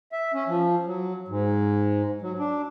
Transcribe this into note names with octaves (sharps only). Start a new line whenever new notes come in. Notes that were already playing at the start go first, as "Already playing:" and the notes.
E5
C#4
F3
F#3
G#2
F#3
D4